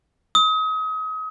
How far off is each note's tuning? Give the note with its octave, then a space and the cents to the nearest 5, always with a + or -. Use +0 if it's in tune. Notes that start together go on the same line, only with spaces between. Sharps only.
D#6 +35